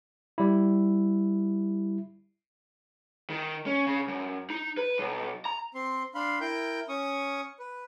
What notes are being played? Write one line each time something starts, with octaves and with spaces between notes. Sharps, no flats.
G3 E4
D#3
C#4
C#3
F#2
D#4
B4
B1
A#5
C4 C6
D4 F5 B5 C6
E4 A#4 G5 G6
C#4 C#6 D#6
B4